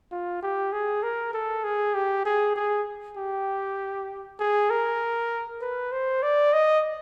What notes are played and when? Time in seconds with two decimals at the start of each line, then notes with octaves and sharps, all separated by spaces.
0.11 F4
0.42 G4
0.72 G#4
1.03 A#4
1.34 A4
1.64 G#4
1.94 G4
2.25 G#4
2.56 G#4
3.17 G4
4.39 G#4
4.70 A#4
5.61 B4
5.92 C5
6.23 D5
6.53 D#5